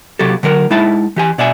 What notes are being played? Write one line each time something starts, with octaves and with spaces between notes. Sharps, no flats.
C3 F#3 G4 A4
D3 F#3 A#4
G#3 D#4 E4 E5 A5
E3 G4 G#5
B2 D5 E5 G#5